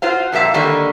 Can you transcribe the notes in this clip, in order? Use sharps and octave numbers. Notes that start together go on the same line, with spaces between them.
F4 F#4 C5 F5
F2 A#2 A3 E5 F5
D3 D#3 G3 A#3